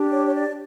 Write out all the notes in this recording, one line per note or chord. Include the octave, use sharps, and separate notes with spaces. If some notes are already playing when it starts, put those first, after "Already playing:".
Already playing: D4 G4
C#5
C#5
D5